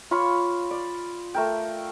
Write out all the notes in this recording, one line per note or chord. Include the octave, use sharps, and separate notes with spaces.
F4 C#5 F5 B5
D5
A3 A#4 G5